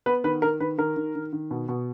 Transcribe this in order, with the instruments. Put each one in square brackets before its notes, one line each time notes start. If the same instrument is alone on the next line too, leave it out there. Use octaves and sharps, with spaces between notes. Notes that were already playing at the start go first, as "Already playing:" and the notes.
[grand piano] B3 B4
D#3 B4
D#3 A#4
D#3 B4
D#3 A#4
D#3
D#3
D#3
B2
B2